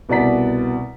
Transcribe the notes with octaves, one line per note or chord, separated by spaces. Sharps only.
C2 B2 B3 D5 A#5 B6